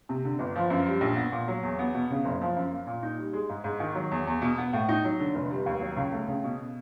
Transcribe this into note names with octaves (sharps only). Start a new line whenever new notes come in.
C3
D3
G1
F3
F#2
G3
A#1
B3
A#2
F#3
E2
B3
B2
C#3
F#1
F3
F#2
A#3
A#2
D#4
G3
G#3
G#2
G#2
D#3
F#3
E2
E2
B2
B3
A2
D#4
F#3
D3
F1
G3
D#2
F#3
C#2
A3
C#3
B2